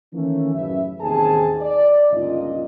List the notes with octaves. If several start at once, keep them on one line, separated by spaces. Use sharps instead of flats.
D#3 E3 A3 A#3 C#4
A1 F#2 C#3 B4 E5
A1 D#2 C3 G#4 G#5 A5
D5
G1 C#2 A#2 D#4 F4 D#5